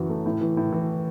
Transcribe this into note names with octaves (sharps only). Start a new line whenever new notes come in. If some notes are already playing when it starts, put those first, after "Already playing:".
Already playing: A1 F#2 E3 F#4
A3
A2
E3
A2
E3